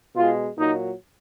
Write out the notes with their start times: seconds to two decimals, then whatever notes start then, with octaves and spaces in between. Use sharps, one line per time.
0.16 B2 G#3 F4
0.58 A#2 F#3 D#4